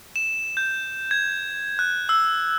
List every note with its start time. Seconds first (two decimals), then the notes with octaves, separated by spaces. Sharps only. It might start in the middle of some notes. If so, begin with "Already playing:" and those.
0.16 E7
0.57 G6
1.11 G#6
1.79 F#6
2.09 E6